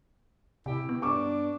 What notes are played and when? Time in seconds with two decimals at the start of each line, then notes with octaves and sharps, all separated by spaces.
0.66 C3 E4 G4
0.89 B3
1.02 G2 D4 C#6 D6